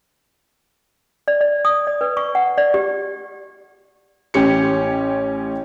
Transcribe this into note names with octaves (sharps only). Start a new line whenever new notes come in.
D5
D5
D#6
D5
B4
C#6
F#5
D5
G4
A1 C#4 G4 C#7